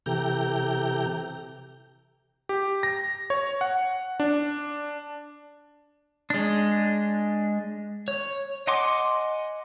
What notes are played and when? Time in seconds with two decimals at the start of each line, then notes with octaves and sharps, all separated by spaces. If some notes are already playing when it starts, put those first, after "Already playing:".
0.06 C3 E3 G4 A4 G5 A#5
2.49 G4
2.83 A#6
3.30 C#5
3.61 F#5
4.20 D4
6.30 G#3 D4
8.08 C#5
8.67 D#5 F#5 G#5 C6 D6